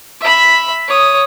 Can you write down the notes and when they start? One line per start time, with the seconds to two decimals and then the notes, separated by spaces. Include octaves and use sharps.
0.21 E5 B5
0.88 C#5 D#6